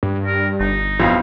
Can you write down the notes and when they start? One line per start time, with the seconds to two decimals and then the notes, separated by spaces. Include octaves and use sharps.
0.03 G2
0.26 A#4
0.60 G1 D#4
1.00 B1 F2 E4 F5